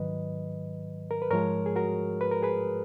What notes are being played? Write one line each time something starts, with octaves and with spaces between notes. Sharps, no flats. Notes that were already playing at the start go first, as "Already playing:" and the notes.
Already playing: G#2 D#3 F#3 B4 D#5
A#4
B4
G#2 F3 G#3 A#4 C#5
G#4
F#4 A#4
B4
A#4
G#4 B4